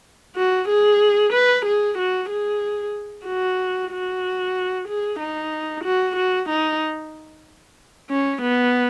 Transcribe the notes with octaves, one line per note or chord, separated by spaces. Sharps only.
F#4
G#4
B4
G#4
F#4
G#4
F#4
F#4
G#4
D#4
F#4
F#4
D#4
C#4
B3